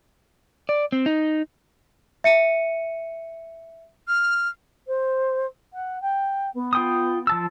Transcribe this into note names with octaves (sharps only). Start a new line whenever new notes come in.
D5
C4
D#4
E5 C#7 D#7
F6
C5
F#5
G5
B3
F4 G5 D#6
F3 A5 E6